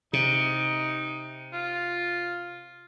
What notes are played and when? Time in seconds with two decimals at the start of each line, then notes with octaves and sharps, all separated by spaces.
0.13 C3 D#4
1.53 F4